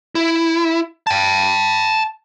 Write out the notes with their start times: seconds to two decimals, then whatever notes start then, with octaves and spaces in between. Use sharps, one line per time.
0.15 E4
1.07 G5 A5